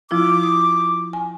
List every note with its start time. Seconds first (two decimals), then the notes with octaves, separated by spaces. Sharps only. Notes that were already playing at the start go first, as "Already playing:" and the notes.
0.11 F3 E4 F4 D6
0.43 D#6
1.13 G#5